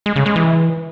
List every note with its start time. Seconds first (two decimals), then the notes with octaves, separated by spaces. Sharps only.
0.06 G#3
0.16 C#3
0.26 G#3
0.36 E3